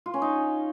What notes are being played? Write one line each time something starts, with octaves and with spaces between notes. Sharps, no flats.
F4
C#4
D#4